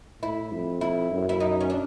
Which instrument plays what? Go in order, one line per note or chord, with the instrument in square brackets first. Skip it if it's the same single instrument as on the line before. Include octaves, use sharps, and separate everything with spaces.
[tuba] A2 [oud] E4
[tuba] F2
[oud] E4
[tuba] F#2
[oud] E4
D#4
C#4
D4